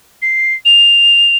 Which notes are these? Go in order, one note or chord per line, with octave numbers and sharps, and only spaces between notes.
C7
F7